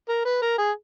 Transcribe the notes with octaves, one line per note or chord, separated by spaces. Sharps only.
A#4
B4
A#4
G#4